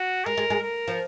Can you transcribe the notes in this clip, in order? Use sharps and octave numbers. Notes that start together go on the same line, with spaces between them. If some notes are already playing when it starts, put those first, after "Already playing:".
Already playing: F#4
G#3 A#4
G#3
G#3
A#4
F3